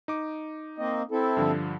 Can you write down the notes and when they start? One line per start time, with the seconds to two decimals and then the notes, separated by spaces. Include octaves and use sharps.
0.08 D#4 D6
0.78 A#3 C4 D#5
1.11 C4 E4 A4
1.37 G2 D3 F3